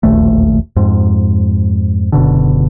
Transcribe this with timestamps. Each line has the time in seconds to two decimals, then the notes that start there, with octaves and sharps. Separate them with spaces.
0.03 E1 A#1 D#2 A3
0.76 F2 G#2
2.12 F#1 B2 D3